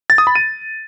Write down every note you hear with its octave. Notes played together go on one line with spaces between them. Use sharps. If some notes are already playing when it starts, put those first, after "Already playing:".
A6
D#6
B5
D#7